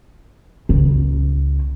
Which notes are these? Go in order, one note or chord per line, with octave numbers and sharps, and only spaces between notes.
C#2